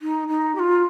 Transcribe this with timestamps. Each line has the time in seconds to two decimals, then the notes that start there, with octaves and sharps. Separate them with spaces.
0.01 D#4
0.28 D#4
0.55 G4
0.59 F4